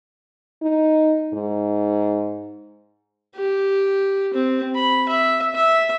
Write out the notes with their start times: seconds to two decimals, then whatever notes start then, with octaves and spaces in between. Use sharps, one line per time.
0.62 D#4
1.33 G#2
3.35 G4
4.33 C4
4.75 B5
5.09 E5
5.55 E5